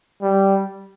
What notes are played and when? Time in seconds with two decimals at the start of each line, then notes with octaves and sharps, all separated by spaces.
0.22 G3